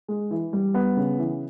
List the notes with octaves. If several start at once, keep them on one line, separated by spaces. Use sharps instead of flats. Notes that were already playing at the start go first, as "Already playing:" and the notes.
G#3
E3
G3
B3
C#3
E3